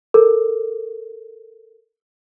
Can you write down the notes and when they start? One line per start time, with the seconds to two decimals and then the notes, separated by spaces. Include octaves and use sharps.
0.14 A4 A#4